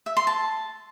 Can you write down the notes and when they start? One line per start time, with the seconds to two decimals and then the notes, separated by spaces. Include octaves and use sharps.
0.06 E5
0.17 C6
0.27 A5